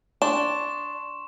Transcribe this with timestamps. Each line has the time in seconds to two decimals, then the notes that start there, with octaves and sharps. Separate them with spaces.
0.22 D4 C6 C#6 E7